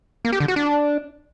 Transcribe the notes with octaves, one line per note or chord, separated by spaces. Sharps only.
A#3
G4
D3
F#4
D4